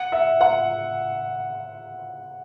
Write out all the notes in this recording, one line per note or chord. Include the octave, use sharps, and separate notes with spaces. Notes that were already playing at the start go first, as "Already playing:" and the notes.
Already playing: F#5
E5
F#5